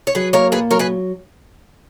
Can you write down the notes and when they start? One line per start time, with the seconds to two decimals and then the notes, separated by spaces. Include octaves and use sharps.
0.07 C#5
0.15 F#3 G#4 B4
0.33 A#3 A#4 C#5
0.52 A#2 G#4 B4
0.71 F#3 A#4 C#5
0.79 G#4 B4